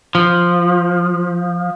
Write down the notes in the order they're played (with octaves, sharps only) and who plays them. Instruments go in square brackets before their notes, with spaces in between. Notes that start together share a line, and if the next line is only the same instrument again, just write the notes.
[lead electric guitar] F3